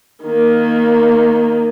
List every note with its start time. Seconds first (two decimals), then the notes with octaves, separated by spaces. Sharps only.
0.24 D#3 A#3